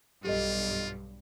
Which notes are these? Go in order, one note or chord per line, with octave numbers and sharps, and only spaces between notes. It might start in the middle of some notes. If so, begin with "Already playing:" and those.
B1 G2 F4 G4 A4 D#5